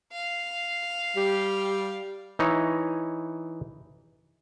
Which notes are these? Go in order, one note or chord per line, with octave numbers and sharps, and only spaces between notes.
F5
G3 G4
E3 D#4 C#5